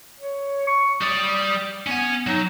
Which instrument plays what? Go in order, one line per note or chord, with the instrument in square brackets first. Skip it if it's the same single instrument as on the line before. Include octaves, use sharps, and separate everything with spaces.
[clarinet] C#5
C#6
[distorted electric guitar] G3 D5 [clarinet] D#6
[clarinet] B3 [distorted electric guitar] C#4 G#5
[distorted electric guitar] F#3 [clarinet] D#4